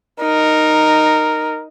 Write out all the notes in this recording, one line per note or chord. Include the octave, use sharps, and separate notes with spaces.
D#4 A#4